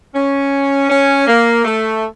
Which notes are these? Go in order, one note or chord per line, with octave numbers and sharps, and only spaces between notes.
C#4
C#4
A#3
A3